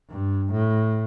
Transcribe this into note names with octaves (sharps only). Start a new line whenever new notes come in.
G2
A2